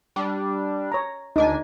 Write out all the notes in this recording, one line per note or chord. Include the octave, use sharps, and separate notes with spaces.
G3 D4
C#5 A#5
D2 D4 D#4 G#5